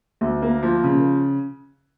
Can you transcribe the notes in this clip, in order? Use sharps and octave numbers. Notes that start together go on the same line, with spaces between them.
D2
A#3
F3
C#3